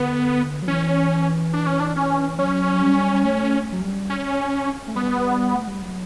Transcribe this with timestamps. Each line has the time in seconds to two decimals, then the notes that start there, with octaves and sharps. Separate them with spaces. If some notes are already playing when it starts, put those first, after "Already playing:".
Already playing: D3 B3
0.62 F#3
0.67 E3 C#4
1.53 D4
1.67 C#4
1.80 D4
1.96 C#4
2.39 F#3 C#4
2.73 F#3
2.81 G3
3.13 G3
3.24 A3
3.72 F#3
3.81 G3
4.10 C#4
4.87 A3
4.95 G3 B3
5.54 A3
5.67 G3
5.81 F#3